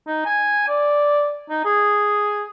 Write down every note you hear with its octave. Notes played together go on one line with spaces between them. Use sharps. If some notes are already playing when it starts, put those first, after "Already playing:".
D#4
G#5
D5
D#4
G#4